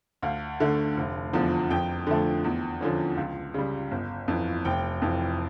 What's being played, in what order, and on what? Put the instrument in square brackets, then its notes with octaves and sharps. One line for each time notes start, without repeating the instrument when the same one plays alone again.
[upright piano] D2 F5
D3 A3
F1
E2 D3 F3
F2 G5
D3 F3 A3
E2
D3 F3 C#4
C#2
C#3 G3
G1
F2 E3
F1 G5
F2 E3